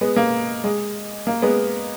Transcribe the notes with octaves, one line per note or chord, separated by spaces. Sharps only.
G#3 B3
A#3
G#3
A#3
G#3 B3